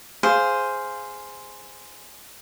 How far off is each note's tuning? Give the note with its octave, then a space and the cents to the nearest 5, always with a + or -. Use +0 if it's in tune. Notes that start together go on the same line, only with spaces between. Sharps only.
G#4 +0 C5 +0 F5 +0